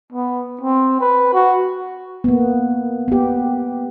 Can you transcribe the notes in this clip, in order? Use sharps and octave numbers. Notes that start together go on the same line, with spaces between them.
B3
C4
B4
F#4
A#3 B3
B3 G4